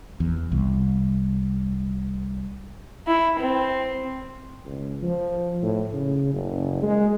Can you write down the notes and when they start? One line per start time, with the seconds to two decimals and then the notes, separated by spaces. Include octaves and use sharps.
0.20 E2
0.52 C2
3.07 E4
3.39 C4
4.66 C#2
5.03 F3
5.63 A2
5.93 C#3
6.34 F#1
6.82 G#3